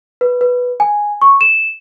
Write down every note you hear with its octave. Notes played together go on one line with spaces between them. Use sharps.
B4
B4
G#5
C#6
E7